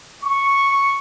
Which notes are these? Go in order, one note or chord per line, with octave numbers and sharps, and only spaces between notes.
C#6